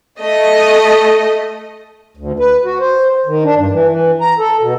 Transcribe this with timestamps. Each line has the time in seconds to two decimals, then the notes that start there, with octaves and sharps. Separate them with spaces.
0.20 A3 D#5
2.17 D2
2.39 B4
2.65 F#4
2.80 C5
3.26 D#3
3.44 D4
3.56 G2
3.71 E3
3.89 E3
4.21 A#5
4.38 A4
4.61 B2